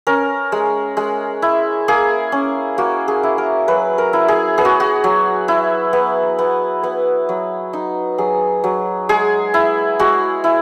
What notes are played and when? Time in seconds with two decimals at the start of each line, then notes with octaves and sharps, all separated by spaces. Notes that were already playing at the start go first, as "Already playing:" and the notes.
0.07 C#4 A#4
0.52 G#3
0.97 G#3
1.42 E4
1.88 A#3 G#4
2.32 C#4
2.78 A#3 F#4
3.08 G#4
3.23 E4
3.38 A#4
3.68 F#3 B4
3.98 A#4
4.13 E4
4.28 G#4
4.58 B3 G#4
4.65 F#4
4.80 F#4
5.04 F#3
5.48 E4
5.93 B3
6.39 B3
6.83 B3
7.29 F#3
7.73 D#4
8.18 F#3 G#4
8.64 F#3
9.09 G#3 G#4
9.54 E4
9.99 G#3 F#4
10.44 E4